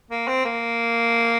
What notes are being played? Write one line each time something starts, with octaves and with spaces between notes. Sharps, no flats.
A#3
C4
A#3